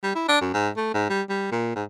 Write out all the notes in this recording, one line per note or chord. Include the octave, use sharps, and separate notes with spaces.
G3
E4
D4
F#2
G#2
A3
G#2
G3
G3
A#2
G#2